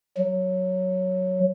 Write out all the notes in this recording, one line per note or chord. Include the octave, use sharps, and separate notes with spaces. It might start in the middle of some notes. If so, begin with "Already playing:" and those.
F#3